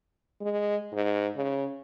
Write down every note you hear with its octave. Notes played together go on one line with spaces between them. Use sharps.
G#3
G#2
C#3